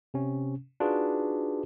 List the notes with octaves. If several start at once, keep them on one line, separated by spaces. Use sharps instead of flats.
C3 C#4
D4 D#4 F4 F#4 G#4 B4